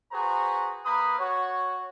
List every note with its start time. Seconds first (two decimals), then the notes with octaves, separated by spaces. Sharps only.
0.12 F#4 G#4 B4 C5 A#5
0.86 A#3 A#4 B4 B5 D#6
1.19 F#4 C#5